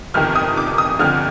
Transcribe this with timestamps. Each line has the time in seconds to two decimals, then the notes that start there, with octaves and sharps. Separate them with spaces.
0.14 G1 F2 C3 D#3 F6
0.35 D#6
0.57 D6
0.78 D#6
0.99 G1 F2 D3 F6